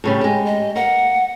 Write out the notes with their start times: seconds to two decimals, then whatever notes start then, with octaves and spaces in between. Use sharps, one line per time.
0.04 A2 C#3 G3
0.21 G#3 G4
0.46 D#5
0.76 A#3 F#5